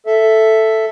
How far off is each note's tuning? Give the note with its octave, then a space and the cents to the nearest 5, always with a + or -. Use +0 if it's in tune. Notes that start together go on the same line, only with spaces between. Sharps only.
A4 +0 E5 +5